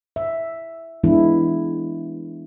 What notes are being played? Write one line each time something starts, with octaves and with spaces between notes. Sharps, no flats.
E5
E3 G#3 B3 D4 E4